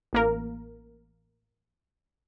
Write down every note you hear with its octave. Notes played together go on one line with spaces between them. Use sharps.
A1 A#3 A#4